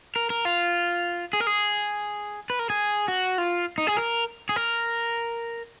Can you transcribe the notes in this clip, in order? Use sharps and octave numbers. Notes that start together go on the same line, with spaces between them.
A#4
A#4
F4
G#4
A#4
G#4
B4
A#4
G#4
F#4
F4
D#4
G#4
A#4
G#4
A#4